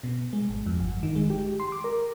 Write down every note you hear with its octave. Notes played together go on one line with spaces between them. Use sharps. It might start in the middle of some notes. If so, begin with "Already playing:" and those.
B2
G#3
G#1
F2
G1
D#3
G#3
G4
C6
D6
A#4